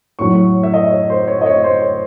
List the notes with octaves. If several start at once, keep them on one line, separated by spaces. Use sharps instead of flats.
A2 F#3 A3 C#6
E5
D#5
C#5
C5
C#5
D#5
C#5
C5
C#5